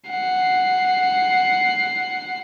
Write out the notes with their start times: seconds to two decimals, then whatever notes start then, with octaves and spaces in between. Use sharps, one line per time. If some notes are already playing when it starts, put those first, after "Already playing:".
0.10 F#5 C7